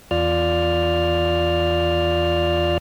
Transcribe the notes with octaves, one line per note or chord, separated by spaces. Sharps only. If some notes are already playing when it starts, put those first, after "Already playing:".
E2 F4 D5 F6